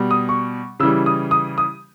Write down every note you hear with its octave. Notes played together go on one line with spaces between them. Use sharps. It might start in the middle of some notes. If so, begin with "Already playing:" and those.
Already playing: B2 G3
D#6
C#6
C#3 E3 G3 E6
D#6
D#6
D#6